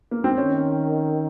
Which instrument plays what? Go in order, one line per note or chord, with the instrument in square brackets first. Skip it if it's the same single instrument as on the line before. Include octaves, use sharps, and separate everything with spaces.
[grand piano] A#3
C4
[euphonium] D#3 [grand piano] C#4